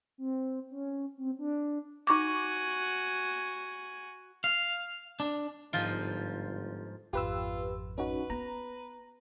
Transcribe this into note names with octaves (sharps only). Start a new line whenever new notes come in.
C4
C#4
C4
D4
D#4 F#4 G#5 C#6 D6
F5
D4
G1 G#2 F3 F4
G#1 F2 F4 G4 B4 E6
C#4 D#4 F#4 B4
B3 A#5